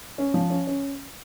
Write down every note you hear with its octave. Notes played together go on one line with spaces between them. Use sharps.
C#4
F3
C#4
C#4